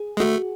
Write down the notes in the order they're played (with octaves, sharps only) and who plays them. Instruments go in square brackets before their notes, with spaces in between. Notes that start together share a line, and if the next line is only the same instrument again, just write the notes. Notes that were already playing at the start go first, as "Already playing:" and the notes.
Already playing: [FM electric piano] G#4
[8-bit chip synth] G#3
[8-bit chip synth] A3 [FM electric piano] F#4